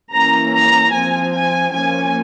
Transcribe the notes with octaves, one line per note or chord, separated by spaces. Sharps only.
E3 A#3 C#4 A#5
A#5
F3 C4 G#5
G#5
F3 A#3 C#4 G#5